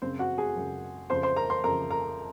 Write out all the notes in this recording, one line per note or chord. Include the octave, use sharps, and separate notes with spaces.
F#2 C#3 C4 C5
F#4 F#5
G#4 G#5
F#2 C#3
F2 C#3 C5 C6
C5 C6
A#4 A#5
C5 C6
F2 C#3 A#4 A#5
A#4 A#5